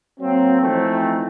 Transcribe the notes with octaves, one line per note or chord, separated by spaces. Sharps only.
F#3 A#3 C4
E3 F3 A3 C4 D#4